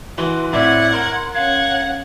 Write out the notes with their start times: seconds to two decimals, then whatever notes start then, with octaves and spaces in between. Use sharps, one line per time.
0.18 E3 F#4 C6
0.53 A2 C4 D5 E5 F#5 G#6
0.92 A#4 C6
1.34 C#4 F5 F#5 G#6